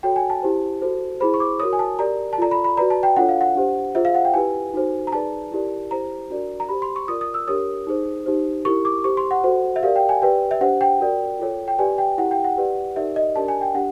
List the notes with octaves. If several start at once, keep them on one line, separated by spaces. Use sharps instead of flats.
F#4 A4 C#5 G5
G#5
A5
E4 G4 C5
F#4 A4 C5
E4 G#4 C5 B5
C#6
D6
F#4 A#4 C#5 D#6
G#5
A5
G4 A#4 D5 A#5
A5
F4 A4 D5 A#5
B5
B5
F#4 B4 D5 A#5
A5
G5
D4 F4 A4 C#5 F#5
F5
F#5
D4 G4 C5
F4 G#4 C5 E5
F5
F#5
G5
E4 G4 B4 G#5
D#4 F#4 A4 C5
A#5
D#4 G#4 B4 D5 A5
E4 G4 A#4 D5
E4 G4 C5 A#5
D4 F#4 A#4 D5
A#5
G4 C5 B5
C6
C#6
F4 A#4 D5 D#6
D#6
E6
D4 G4 A#4 C#5 D#6
D#4 G#4 C5
D#4 G4 C5
E4 G4 A#4 C#6
D6
G4 C5 C#6
C6
F#5
F#4 A4 C5
E5
G4 A#4 D5 F5
G5
G#5
G4 B4 D5 G5
E5
D4 G4 C5 F#5
G5
F#4 A#4 D5
F4 A4 C#5
G5
G4 B4 D5 G#5
G5
E4 G4 A#4 F#5
G5
F#5
G4 B4 D5
D#4 G4 A#4 D5 E5
D#5
D4 G4 A#4 D5 A5
G#5
G5
D4 G4 F#5